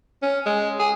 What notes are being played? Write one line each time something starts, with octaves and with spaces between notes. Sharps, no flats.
C#4
G#3
G#4